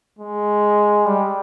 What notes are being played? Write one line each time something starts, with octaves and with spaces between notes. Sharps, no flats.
G#3
G3